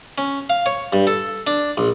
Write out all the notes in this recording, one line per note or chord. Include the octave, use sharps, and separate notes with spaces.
C#4
F5
C#5
G2
A4
D4
A#1